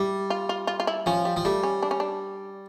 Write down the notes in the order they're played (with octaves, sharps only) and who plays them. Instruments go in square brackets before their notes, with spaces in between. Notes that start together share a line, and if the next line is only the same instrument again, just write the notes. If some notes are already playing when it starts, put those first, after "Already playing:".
Already playing: [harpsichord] G3 [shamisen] E4
[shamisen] F4
F4
F4
F4
E4
[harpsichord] F3 [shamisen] C#4
[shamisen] G3
[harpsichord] F3
[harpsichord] G3 [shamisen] A3
[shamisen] C#4
D4
C#4
D4